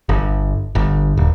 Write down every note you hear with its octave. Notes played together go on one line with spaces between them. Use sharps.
G1
G1
D#1